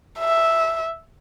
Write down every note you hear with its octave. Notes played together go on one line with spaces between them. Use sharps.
E5